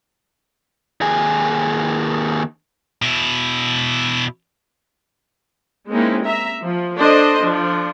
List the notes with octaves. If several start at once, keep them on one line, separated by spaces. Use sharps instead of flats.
D#2 G#4
B2 E4
G#3 A#3 C4 C#4 D#4 E4
E5 A#5
F3
D4 A4 C5 D#5
F3 D4